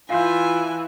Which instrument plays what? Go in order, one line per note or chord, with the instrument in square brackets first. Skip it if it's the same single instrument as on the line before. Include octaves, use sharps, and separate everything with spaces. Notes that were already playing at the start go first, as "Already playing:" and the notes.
[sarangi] E3 [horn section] F4 [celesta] F5 C6 G6 [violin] G#5